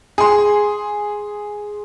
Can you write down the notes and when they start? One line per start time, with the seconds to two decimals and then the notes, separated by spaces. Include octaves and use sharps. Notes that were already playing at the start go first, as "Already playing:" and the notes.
0.18 G#4 C6